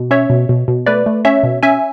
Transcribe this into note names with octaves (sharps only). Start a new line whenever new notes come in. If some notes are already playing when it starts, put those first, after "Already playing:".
Already playing: B2
C#4 C#5 E5
B2
B2
B2
A3 B4 D5
A3
C#4 C#5 E5
B2
C#4 E5 G#5